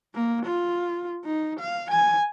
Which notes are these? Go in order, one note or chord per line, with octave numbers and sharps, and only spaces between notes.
A#3
F4
D#4
F5
G#5